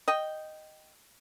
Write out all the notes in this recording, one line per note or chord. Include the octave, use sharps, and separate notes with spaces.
D#5 G5